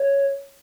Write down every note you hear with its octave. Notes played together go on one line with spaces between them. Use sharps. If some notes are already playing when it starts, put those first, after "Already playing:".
Already playing: C#5